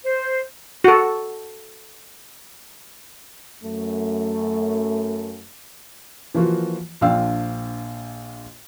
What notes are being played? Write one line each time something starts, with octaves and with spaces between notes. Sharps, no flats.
C5
F#4 A4
F#2 A3
E3 F3 A#3 F4 F#4
A#1 F3 D4 F5 G5 E6